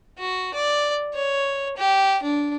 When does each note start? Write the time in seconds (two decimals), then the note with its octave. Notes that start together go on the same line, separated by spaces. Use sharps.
0.19 F#4
0.54 D5
1.14 C#5
1.77 G4
2.22 D4